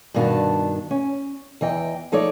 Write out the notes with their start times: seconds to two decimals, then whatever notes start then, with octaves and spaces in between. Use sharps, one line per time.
0.14 G2 B2 D#3 D4 F#4 A5
0.91 C#4
1.61 E2 E3 D#5 G5
2.12 F3 D#4 A4 C#5 D5